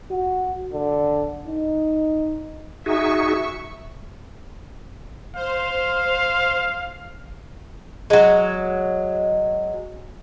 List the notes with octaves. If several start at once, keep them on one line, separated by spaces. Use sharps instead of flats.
F#4
D3
D#4
D#4 F#4 G#4 E5 C#6
C5 F5
F#3 G#3